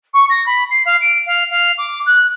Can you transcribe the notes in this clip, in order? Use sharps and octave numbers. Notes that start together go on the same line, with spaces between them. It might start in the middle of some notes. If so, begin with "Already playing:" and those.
C#6
A#6
B5
C7
F5
D7
F5
F5
D6
F#6